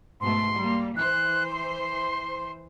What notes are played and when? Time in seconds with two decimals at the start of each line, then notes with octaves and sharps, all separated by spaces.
0.21 G#2 B2 A3 C6
0.56 G3 A#3
0.96 E3 C5 F#6
1.52 C6